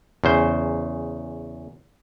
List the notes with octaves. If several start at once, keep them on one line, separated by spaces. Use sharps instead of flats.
E2 C#3 C5